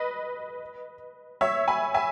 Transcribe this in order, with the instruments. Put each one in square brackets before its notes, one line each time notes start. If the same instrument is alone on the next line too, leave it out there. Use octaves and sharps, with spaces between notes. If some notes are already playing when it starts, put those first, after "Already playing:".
Already playing: [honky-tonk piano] B4 D#5
C#5 E5
G#5 B5
E5 G#5